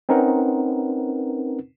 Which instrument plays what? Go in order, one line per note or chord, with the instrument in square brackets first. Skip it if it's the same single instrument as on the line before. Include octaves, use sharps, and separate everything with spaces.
[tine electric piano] C4 C#4 D#4 A#4 B4 F#5